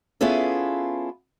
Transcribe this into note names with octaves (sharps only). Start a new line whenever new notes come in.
B3 C#4 E4 F4 G#4 A4